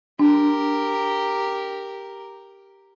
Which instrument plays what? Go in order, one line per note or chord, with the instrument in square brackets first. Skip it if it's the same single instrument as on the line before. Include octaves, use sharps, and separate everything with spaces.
[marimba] D4 [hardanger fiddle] G4 A#4